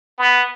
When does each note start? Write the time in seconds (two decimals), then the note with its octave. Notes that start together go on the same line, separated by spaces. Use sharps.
0.18 B3